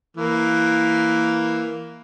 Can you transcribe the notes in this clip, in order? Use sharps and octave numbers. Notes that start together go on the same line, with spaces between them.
E3 A#3